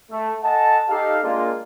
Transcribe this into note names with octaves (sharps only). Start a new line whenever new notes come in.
A3
A4 D#5 F#5 G#5 A5
D#4 G4 A4 F5
G#3 A#3 D4 F4